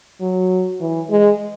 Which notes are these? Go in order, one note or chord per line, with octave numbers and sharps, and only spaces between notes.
F#3
E3
G#3